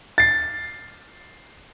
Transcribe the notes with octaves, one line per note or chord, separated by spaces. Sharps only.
A6 C7